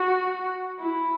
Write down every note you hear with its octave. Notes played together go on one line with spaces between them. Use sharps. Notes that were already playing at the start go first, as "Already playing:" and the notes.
Already playing: F#4
E4